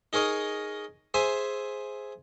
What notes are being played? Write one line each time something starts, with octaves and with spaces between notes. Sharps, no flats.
D#4 G#4 A#4 C#5 D#5
G#4 C5 E5 G#5